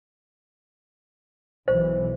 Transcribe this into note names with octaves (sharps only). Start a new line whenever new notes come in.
B1 E3 C5